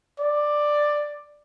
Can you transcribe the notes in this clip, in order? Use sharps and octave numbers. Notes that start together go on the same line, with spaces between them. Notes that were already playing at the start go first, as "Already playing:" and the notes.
D5